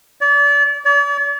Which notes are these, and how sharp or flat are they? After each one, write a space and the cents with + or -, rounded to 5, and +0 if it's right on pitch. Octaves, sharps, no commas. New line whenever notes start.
D5 -35
D5 -45